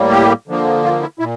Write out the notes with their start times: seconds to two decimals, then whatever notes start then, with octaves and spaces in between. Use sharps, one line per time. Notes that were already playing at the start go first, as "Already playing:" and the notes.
Already playing: A2 G3 A#3
0.11 G4
0.48 D3 F3 A#3
0.84 F4
1.01 E4
1.19 A#2 E4